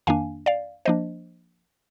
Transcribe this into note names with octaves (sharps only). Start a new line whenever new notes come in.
F2 D#3 A#3 D4 F5 G#5
D5 F5
F3 A#3 D4 C5 D#5